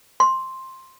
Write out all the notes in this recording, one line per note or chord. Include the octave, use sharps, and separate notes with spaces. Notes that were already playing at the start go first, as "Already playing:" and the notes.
C6